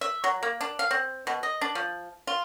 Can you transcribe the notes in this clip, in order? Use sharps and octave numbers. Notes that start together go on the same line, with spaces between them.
E5
F#3
A#3
D4
F5
C4
B2
D#5
D4
F3
F4